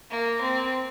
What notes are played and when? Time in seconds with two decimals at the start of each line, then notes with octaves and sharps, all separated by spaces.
0.10 A#3
0.41 C4